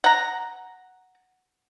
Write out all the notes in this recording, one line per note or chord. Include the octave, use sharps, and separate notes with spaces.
F#5 A#5